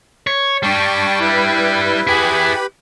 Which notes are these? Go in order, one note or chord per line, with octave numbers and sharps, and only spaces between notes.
C#5
G3 D4 G5 A5 C#6
E4 B4
E4 G4 G#4 B4 B5